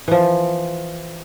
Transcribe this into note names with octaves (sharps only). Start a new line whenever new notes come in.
E3 F3